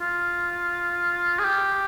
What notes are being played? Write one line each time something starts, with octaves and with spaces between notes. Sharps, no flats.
F4
G#4
G4